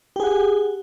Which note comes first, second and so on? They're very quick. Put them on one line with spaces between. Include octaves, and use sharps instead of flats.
G4 G#4 F#5